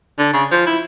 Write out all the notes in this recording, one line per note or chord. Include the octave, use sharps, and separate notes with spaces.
D3
C#3
F3
E4